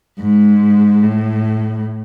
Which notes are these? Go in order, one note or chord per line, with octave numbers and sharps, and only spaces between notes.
G#2
A2